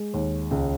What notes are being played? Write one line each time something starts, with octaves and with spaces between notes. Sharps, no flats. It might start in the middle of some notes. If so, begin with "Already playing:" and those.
Already playing: G#3
D#2
C#2